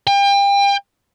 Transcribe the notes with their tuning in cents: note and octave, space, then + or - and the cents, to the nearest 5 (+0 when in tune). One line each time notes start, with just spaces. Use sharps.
G5 +35